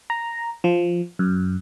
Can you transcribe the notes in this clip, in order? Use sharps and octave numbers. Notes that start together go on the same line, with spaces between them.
A#5
F3
F#2